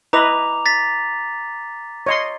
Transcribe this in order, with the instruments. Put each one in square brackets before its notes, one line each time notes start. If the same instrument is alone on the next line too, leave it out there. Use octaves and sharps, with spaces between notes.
[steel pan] E4 B4 D#5 [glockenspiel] A#5 D6 F7
[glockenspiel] A6 B6
[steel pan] C#5 D#5 C6